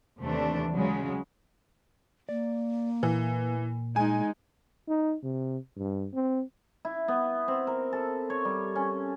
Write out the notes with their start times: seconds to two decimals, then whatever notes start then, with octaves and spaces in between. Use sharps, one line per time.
0.21 D#2 C3 E3 A3 D4
0.75 C#3 F#3 G#3
2.29 A#3 D5
3.03 A#2 E3
3.96 G#3 D#4 G#5
4.88 D#4
5.23 C3
5.77 G2
6.14 C4
6.85 E4
7.08 B3
7.48 C4
7.67 A#4
7.93 A4
8.30 C#5
8.45 G3
8.75 C#4